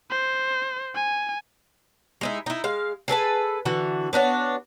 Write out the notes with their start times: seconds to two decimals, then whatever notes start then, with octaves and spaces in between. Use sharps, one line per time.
0.11 C5
0.95 G#5
2.21 G#3 D#4 E4
2.46 D#4 E4
2.64 G#3 F5
3.08 G#4 A4 B4 A5
3.65 D3 E3 F#4
4.13 B3 D4 F#4 C#5